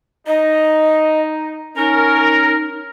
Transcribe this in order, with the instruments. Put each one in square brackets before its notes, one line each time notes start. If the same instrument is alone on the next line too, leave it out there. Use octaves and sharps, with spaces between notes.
[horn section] D#4 [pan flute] D#5
[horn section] C#4 A#4 [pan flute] D#4